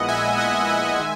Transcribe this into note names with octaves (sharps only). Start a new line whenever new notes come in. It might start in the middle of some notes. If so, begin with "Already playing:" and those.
Already playing: A#1 A#2 G#3 B3 E4 D#5 F#5
E5 G#5
D#5 F#5
E5 G#5
D#3 G#3